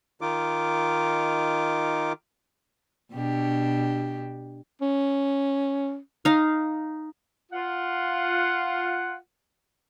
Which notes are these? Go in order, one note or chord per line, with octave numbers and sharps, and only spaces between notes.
D#3 D#4 F4 D6
B2 D4 G4
C#4
D#4 F5
F4 F#5